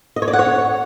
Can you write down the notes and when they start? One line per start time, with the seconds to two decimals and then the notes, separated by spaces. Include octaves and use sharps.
0.16 D#5
0.22 C#5
0.28 D5
0.33 F#5
0.39 C#5